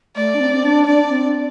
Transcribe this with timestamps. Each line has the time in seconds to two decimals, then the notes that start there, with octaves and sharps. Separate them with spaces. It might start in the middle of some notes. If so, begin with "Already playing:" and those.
0.16 A3 D5
0.34 D4
0.40 C4
0.54 C4
0.64 D4
0.87 D4 D5
1.11 C4